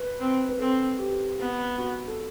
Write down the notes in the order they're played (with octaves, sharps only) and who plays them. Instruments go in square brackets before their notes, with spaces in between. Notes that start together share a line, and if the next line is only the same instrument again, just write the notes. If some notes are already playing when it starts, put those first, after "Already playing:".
Already playing: [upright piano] B4
[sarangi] C4
[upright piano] B4
[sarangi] C4 [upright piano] A4
[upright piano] G4
[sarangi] B3
[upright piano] F#4
A4